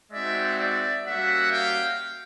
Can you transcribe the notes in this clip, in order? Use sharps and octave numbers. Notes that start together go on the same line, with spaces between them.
G#3 C4 D#4 F#4 D5 E5
D5 E5
G3 A#3 C#4 F#4 E5 F#5
F5 G5